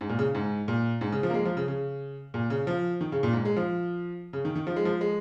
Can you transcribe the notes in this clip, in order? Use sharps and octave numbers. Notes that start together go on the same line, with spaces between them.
G#2
A#2
C#3
G#2
A#2
G#2
C#3
F3
A#3
G#3
F3
C#3
C#3
A#2
C#3
F3
D#3
C#3
A#2
G#2
G#3
F3
C#3
D#3
D#3
F3
G#3
F3
G#3